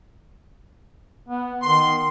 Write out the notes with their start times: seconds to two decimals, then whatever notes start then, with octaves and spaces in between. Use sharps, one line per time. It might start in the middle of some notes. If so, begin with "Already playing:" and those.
1.29 B3
1.62 D#3 C6